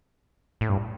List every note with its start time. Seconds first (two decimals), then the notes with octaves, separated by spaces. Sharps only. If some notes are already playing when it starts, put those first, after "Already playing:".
0.61 A2
0.69 G2